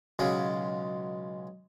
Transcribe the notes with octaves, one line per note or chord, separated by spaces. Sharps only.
B1 C#3 F#3 G#3 F4